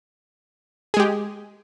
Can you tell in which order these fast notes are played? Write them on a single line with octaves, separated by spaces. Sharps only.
G#4 G#3 G4